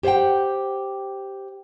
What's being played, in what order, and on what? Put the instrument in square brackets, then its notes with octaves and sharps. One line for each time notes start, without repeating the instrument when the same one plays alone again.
[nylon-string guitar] G4 C5 C#5 F#5 G5